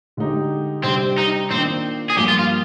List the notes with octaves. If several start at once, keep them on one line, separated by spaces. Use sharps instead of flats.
D3 G#3 D#4 G4
C3 G3 C4 D4 G4
D#4
D#3 A#3 C4 D4 F4
G#4
G2 F3 A#3 G4
F4
F4